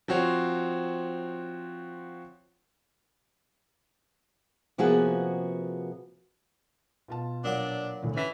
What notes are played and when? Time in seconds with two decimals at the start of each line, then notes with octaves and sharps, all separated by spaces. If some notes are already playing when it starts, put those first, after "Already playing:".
0.08 F3 C4 F#4 C#5
4.78 C3 F3 A#3 B3 F#4 G#4
7.08 B2 F4 A5
7.44 A#2 F#3 D4 D6
8.03 D2 A2 D3
8.16 E3 C#4 B6